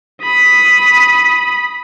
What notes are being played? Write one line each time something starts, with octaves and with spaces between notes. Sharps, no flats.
B5 D#6